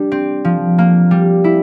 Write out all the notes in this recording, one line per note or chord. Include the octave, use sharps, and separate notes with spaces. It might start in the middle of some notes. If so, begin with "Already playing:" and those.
Already playing: G3 D4
C4
F3
A#3
G3
E4